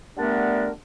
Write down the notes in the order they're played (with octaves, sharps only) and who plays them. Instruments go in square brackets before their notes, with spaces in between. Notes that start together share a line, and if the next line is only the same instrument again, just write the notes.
[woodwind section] D3 G3 A3 B3 D4 A#4